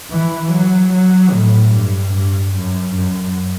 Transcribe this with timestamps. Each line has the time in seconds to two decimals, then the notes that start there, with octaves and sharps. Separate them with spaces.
0.11 E3
0.52 F#3
0.93 F#3
1.33 A2
1.73 G2
2.14 G2
2.55 F#2
2.96 F#2